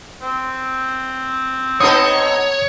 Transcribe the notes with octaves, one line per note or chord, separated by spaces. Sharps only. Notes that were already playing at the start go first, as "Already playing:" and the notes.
C4
B3 D#4 A4 C#5 D#6